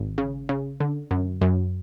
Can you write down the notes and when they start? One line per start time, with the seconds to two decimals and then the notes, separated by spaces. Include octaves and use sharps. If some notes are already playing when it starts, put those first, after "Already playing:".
Already playing: G#1
0.18 C#3
0.49 C#3
0.80 D3
1.11 F#2
1.41 F#2